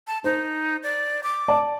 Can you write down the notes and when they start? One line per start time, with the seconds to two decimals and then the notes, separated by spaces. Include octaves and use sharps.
0.07 A5
0.24 D#4 C5
0.83 D5
1.23 D6
1.48 D5 A5